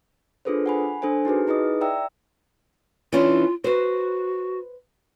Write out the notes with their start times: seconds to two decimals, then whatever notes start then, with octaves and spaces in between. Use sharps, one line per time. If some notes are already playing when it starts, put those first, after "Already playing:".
0.45 D4 F4 G#4 A4 B4 C5
0.66 F#5 G#5 B5
1.02 D4 A4 C5 G#5
1.25 D#4 F#4 G#4 B4
1.47 D#4 E4 G#4 B4 D#5 D#6
1.81 D5 E5 G5 A#5 E6
3.12 E3 C#4 D4 F4
3.64 F#4 B4 C5